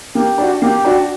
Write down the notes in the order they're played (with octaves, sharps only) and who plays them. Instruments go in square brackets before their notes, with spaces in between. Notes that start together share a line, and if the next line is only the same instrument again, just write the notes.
[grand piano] A#3 [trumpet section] G4
[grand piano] D4 F#4
[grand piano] A#3 [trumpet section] G4
[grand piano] D4 F#4